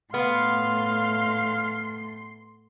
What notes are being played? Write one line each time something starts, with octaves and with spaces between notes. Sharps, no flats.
A2 B3 F5 C6 C7